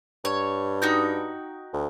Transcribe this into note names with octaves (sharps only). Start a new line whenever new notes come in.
G2 C#5
D#4 F#4 G5
D2